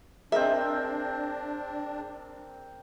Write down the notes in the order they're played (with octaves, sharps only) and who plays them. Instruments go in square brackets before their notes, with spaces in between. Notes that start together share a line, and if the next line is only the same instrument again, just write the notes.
[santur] C4 A#4 [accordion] D4 [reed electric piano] G#4 [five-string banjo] D#5 E5